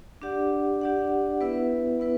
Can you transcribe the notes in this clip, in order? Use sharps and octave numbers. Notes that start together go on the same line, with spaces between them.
D4 G4 D5 F#5
D4 G4 D5 F#5
B3 E4 B4 E5
B3 E4 B4